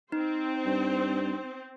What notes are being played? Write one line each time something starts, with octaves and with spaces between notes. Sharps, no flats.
C4 D#4 C5
G2